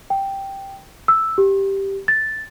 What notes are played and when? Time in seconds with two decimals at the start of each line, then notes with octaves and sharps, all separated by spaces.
0.10 G5
1.08 E6
1.38 G4
2.08 A6